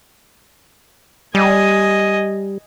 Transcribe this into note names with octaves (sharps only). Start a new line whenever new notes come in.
G3 D#5 G#5